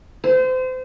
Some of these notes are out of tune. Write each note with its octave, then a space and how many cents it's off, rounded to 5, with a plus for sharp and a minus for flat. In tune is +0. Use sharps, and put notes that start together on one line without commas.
C5 -30